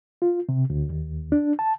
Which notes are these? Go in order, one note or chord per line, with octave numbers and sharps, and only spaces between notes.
F4
C3
D2
D#2
D4
A5